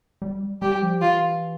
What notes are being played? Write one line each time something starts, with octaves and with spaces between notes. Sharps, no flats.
G3
G3 G4
F3
E3 F4